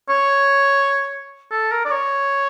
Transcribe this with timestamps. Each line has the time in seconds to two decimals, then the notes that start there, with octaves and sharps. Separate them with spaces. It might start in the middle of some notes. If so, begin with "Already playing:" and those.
0.10 C#5
1.51 A4
1.72 A#4
1.85 D5
1.91 C#5